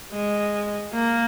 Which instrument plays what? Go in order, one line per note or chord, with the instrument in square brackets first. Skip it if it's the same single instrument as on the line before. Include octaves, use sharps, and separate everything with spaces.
[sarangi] G#3
A#3